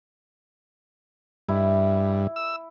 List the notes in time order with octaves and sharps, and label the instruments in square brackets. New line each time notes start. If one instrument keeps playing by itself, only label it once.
[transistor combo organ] G2 [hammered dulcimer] E4
[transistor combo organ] E6